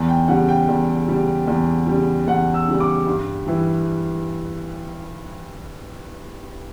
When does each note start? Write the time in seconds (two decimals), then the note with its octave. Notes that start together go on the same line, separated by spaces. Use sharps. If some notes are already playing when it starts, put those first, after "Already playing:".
Already playing: E2
0.09 G5
0.28 C#3 G3 F#5
0.49 G5
0.68 E2
1.08 C#3 G3
1.47 E2
1.87 C#3 G3
2.27 E2 F#5
2.54 E6
2.68 C#3 G3
2.80 D6
3.07 G2
3.47 E3 G3